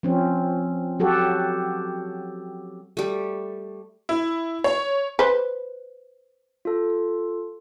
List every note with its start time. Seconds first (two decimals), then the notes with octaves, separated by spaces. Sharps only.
0.03 F3 C4 C#4
1.00 F#3 F#4 G4 A4
2.97 G3 A3
4.09 E4
4.64 C#5
5.19 B4 C5
6.65 F4 A4